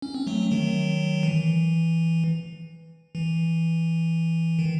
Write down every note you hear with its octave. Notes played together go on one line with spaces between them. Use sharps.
C#4
C4
F#3 A3
D#3 F#3
E3
E3
D#3